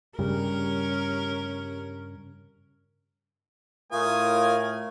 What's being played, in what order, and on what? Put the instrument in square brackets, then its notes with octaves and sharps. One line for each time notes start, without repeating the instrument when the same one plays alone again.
[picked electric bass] G2 C#3 G3 [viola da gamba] C#4 A#4
[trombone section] A2 A#4 [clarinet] A3 [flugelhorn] F4 [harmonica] G#5 D#6